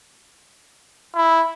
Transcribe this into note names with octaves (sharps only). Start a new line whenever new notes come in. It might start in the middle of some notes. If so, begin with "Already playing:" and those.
E4